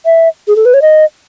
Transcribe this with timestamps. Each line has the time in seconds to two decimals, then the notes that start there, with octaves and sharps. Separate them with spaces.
0.06 E5
0.48 G#4
0.56 A4
0.65 B4
0.74 C#5
0.82 D#5